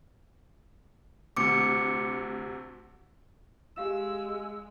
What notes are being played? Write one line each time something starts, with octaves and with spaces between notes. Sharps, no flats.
D2 C3 D6 C#7
G#3 G4 F5 E6 E7